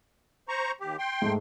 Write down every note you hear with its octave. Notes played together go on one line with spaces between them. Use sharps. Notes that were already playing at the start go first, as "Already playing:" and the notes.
C5 A#5 C#6
D#2 G4
G5 C6
G#2 A3